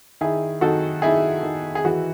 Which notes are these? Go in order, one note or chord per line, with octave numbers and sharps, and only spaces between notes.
D#3 E4 G#4
D#3 F#4 A4
D#3 E4 G#4
D#3
G#4
E3 F#4